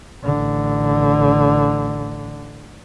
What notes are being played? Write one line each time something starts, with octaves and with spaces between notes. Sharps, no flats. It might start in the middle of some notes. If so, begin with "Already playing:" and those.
A1 D3